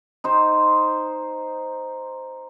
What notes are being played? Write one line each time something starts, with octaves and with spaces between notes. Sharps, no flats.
D#4 C5